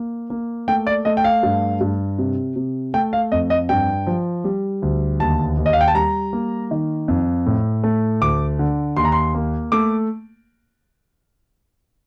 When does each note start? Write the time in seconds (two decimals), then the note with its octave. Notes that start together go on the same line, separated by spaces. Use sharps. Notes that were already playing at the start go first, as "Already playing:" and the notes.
Already playing: A#3
0.30 A#3
0.68 A3 G5
0.87 D5
1.05 A3 D#5
1.17 G5
1.24 F5
1.43 G2
1.81 G2
2.18 C3
2.56 C3
2.94 A3 G5
3.13 F5
3.32 F2 D#5
3.50 D#5
3.69 G2 G5
4.07 F3
4.44 G3
4.82 D2
5.20 D#2 A5
5.57 D#2
5.66 D#5
5.73 F5
5.81 G5
5.88 A5
5.95 G3 A#5
6.33 A#3
6.71 D#3
7.08 F2
7.46 A2
7.84 A3
8.21 D2 D6
8.59 D3
8.97 D#2 C6
9.05 A#5
9.12 C6
9.34 A#3
9.72 A3 D6